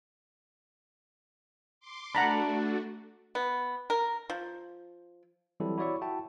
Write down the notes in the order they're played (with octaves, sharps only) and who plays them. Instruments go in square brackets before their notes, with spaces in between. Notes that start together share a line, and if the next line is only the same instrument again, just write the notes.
[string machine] C6 D6
[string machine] A3 F#4 [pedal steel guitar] D4 [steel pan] F#5 A#5 B5
[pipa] B3
A#4
F3
[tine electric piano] E3 F#3 G3 C4 E4 A4
E4 F#4 C#5 D5 E5 C#6
E4 F#4 E5 G5 A5